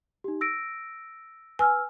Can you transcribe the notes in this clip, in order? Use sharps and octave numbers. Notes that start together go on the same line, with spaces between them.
D#4 G4
E6 A#6 D7
B4 G#5 E6 F6